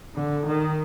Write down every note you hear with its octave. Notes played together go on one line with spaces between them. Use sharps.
D3
D#3